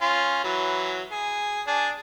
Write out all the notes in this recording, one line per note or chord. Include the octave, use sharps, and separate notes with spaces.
C#4 F4
E3 F#3
G#4
D4 G#4